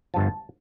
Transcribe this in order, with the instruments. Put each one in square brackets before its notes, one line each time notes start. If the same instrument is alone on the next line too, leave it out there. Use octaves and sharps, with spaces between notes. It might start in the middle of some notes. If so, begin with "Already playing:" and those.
[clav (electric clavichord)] G1 G2 F3 A5